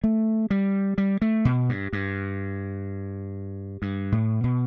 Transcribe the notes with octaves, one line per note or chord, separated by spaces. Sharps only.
A3
G3
G3
A3
B2
G2
G2
G2
A2
B2